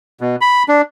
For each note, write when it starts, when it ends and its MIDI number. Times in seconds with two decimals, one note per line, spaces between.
0.21 0.36 47
0.41 0.63 83
0.68 0.82 62